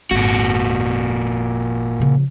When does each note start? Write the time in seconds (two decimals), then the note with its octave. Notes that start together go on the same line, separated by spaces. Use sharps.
0.11 G#1 F2 A#2 F#4
2.00 C#3 F3